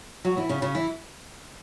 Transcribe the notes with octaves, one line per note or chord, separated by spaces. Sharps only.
F#3 F#4
E3 E4
C#3 C#4
C#3 C#4
E3 E4